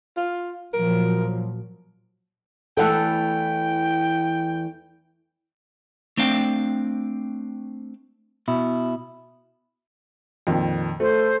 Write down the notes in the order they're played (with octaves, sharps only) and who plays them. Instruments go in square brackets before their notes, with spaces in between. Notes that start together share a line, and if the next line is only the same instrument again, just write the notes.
[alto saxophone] F4
[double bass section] A#2 F3 F#3 [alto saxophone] A#4
[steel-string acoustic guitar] E2 E3 A3 [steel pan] A4 F#5 [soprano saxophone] G5
[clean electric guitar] A3 C4 D4 F5 G5
B2 E4
[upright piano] F2 A#2 D#3
[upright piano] A3 [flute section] A4 C5